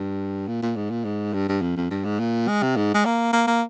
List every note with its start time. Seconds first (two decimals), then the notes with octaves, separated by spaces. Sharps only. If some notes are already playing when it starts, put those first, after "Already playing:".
Already playing: G2
0.48 A#2
0.63 A#2
0.76 G#2
0.90 A#2
1.05 G#2
1.34 G2
1.49 G2
1.62 F2
1.77 F2
1.91 G2
2.05 G#2
2.19 A#2
2.48 G#3
2.63 C3
2.76 G#2
2.94 G#3
3.05 A#3
3.33 A#3
3.47 A#3